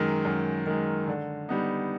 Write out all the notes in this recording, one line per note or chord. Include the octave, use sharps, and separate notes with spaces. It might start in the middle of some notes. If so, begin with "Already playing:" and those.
Already playing: F#2 D#3 G#3
F#2
D#3 G#3
D3
G3 B3 D#4